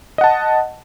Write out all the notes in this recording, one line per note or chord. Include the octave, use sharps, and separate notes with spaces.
D#5 F#5 A5